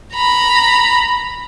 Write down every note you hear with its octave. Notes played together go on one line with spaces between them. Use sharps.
A#5 B5